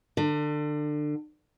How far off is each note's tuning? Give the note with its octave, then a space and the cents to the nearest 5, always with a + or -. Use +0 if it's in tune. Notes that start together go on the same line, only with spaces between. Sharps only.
D3 +25